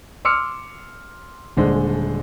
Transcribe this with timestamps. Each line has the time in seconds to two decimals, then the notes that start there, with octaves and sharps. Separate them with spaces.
0.25 C6 D6 E6 F6 C#7
1.57 D#1 D3 G#3 C5